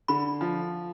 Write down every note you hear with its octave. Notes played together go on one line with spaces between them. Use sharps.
D3 B5
F3